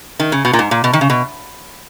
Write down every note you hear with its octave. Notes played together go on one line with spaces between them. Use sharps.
D#3
C#3
B2
A#2
G#2
A#2
B2
D#3
C#3
B2